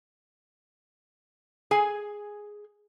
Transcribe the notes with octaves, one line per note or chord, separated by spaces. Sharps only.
G#4 G#5